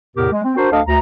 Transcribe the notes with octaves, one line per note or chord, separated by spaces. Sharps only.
E2 A2 C3 B3 G4 A#4
G#3
C4
D4 F#4 A#4 C5
D2 D4 A4 D#5 F5
D2 A#5